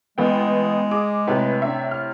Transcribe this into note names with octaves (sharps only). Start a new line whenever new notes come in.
A1 G#3 B3 G5
G#4 D6
A2 C3 B4
D4 E5
F6